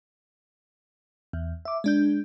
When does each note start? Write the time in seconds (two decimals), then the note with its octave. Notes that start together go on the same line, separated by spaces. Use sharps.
1.33 E2
1.65 E5 D6
1.84 G#3 D4 G6